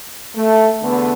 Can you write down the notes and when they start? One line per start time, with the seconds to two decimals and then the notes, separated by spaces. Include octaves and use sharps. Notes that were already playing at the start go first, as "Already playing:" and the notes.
0.36 A3
0.82 E2 D3 A3 B3